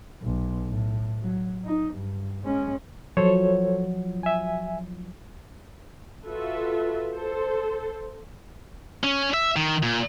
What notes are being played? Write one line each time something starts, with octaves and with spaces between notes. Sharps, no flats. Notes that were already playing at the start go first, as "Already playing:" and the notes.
B1
A2
F#3
D#4
G2
G#3 C#4
F3 F#3 A4 C5 C#5
E5 G#5
F4 F#4 A4 B4 E5
A4 C5
C#4
E5
D#3
A#2